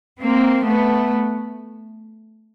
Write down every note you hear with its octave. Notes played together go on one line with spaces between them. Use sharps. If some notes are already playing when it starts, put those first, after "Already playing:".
A#3 C4
A3 B3